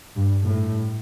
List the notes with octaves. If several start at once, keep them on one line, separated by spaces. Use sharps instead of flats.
G2
A2